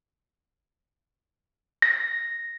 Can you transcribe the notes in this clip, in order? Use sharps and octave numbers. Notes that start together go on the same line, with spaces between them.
A#6